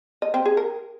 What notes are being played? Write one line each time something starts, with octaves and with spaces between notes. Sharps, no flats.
D#5
C4
G#4
A#4